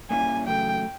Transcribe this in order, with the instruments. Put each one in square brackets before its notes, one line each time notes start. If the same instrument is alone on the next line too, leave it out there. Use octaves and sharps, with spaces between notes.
[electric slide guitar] A#2 G3 A#3 C#4 E4 [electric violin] G#5
[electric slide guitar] E2 C#3 F#3 A3 [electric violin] G5